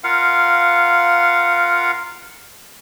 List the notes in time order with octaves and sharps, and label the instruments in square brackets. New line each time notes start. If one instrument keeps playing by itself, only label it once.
[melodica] F4 A#4 F5 F#5